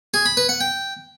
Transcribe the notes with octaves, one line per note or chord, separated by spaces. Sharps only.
G#4
B5
B4
F#5
G5